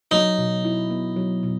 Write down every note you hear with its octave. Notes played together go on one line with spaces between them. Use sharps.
F#3 D#4
B2
E4
B3
F#3
B2